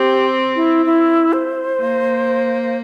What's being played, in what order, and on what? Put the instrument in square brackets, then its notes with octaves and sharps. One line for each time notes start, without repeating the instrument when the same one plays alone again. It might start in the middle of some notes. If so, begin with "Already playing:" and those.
Already playing: [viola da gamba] C4 [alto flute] G4
[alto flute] E4
E4
C5
[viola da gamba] A#3